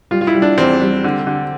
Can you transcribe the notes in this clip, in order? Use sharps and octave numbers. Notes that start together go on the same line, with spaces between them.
G3 F4
F4
E4
G3
D4
E2 C4
G3
D3
D3